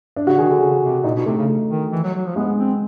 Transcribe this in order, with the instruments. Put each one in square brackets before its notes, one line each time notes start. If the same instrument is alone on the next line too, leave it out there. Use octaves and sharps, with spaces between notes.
[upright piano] D4
[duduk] C#3 [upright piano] F#4
[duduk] D#3 [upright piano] G#4
[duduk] D3 [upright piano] A4
[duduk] C#3 [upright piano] G#4
[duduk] C3
[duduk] A#2 [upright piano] D#4
[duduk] B2
[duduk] C3 [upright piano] A3
[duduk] C#3
D#3
E3
F#3
F#3
F3
[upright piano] G#3 [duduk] B3
[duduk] C4